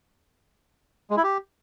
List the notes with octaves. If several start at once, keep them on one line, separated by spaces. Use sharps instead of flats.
G#3
E4
G4